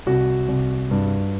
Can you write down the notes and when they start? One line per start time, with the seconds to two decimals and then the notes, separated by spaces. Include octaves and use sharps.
0.06 C2 F#4
0.48 C2
0.91 G2